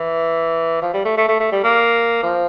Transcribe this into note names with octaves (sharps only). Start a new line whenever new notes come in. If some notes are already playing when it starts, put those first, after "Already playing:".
Already playing: E3
F3
G3
A3
A3
A3
A3
G3
A#3
F3